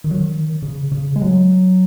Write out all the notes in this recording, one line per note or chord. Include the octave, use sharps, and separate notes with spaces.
D#3
F#3
D#3
C#3
C#3
G#3
F#3